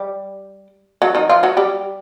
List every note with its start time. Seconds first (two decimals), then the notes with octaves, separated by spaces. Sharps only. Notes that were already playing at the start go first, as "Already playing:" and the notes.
Already playing: G3 G4
1.02 F#3 F#4
1.15 D#3 D#4
1.29 F3 F4
1.43 F#3 F#4
1.57 G3 G4